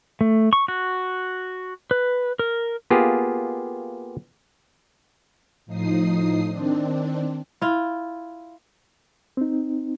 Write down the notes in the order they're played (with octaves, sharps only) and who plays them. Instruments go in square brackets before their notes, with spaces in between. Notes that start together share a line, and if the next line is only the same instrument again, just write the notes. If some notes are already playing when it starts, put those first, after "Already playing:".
[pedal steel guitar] A3
C#6
F#4
B4
A#4
[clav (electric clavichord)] A#3 B3 F4 G4 G#4
[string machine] A2 F3 D#4 D#6 C7
D#3 C4 D4
[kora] E4 F4
[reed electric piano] C4 D#4